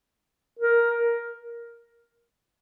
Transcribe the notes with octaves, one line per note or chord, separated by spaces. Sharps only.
A#4